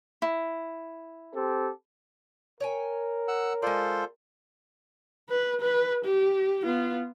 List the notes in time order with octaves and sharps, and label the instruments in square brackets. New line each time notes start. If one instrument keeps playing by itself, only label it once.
[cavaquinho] E4
[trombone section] C4 G4 A4
[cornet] A#4 [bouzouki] C#5 G5 G#5
[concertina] F#5 E6
[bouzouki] G#3 D5 [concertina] F4 A4 C5
[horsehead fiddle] B4
B4
G4
B3 F4